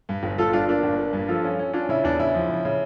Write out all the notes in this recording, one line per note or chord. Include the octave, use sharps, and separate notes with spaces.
G2
G1
G1 F4 A4
G2 D4 F4
A#3 D4 F4
G1
A#3
G2
F3 F4 A4
C#4
C#4
C#4 D4 F4
C#3 E4
E2 D4
C#3 E4
F3
C#3
C#3